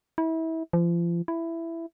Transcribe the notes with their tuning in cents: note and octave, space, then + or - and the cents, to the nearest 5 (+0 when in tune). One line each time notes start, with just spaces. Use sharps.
E4 -30
F3 -35
E4 +10